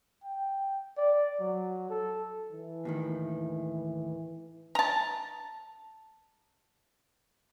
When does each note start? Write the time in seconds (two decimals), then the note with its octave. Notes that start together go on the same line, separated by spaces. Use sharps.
0.24 G5
0.97 D5
1.40 F#3
1.90 A4
2.52 E3
2.85 D#2 A2 D#3
4.75 A5 A#5